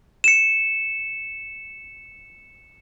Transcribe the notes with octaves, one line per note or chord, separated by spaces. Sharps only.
C#7 E7